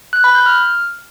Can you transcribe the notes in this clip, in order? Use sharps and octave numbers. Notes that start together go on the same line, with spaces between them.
F#6
B5
G6
F6